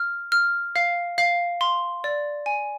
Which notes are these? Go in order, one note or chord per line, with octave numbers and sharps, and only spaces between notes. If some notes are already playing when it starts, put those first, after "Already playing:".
Already playing: F6
F6
F5
F5
C6
D5
G#5